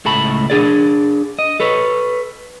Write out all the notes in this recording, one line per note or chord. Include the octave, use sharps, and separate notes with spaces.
C#2 A2 A3 A5 B5
D4 G#4 D5
D#5
A4 B4 C#5